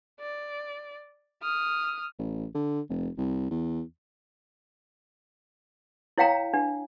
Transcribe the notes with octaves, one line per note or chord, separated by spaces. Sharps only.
D5
D#6 F6
A1
D3
F1
C2
E2
E4 C#5 F5 G5 A#5
D4